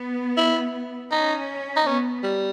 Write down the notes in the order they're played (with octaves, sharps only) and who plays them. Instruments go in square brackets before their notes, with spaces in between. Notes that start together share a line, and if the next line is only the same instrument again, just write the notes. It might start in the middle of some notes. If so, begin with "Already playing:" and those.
Already playing: [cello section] B3
[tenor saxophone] E4
[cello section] C#4 [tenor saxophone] D#4
[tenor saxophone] D#4
[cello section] B3 [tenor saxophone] C#4
[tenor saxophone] G3